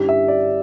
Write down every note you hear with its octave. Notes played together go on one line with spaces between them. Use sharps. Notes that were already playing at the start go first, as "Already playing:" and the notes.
Already playing: G2 D3 G3 C#4 E4 G4
E5
D5